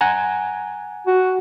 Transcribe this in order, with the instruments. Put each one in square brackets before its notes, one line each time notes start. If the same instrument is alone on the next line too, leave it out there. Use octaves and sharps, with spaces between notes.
[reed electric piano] F#5 G#5 A#5
[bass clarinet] F#4